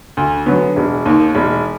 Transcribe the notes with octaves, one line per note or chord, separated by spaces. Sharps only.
D2
D3 F#3 B3
E1
D#2 D#3
E1